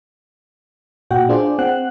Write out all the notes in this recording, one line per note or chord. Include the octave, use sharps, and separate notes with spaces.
A#2 F#4 F#5 G5
D4 F4 G#4 C5 D5
C4 F#5 F#6